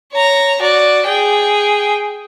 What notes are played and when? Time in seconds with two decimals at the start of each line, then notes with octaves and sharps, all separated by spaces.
0.12 C#5 A#5
0.60 F#4 D5
1.07 G#4 G5